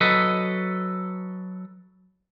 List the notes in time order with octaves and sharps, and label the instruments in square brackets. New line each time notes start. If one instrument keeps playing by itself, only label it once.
[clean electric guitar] F#3 A4 B4 D#5